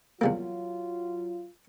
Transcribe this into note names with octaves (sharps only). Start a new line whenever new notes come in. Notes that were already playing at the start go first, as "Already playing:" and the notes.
E2 F#3 G3 A#3 F4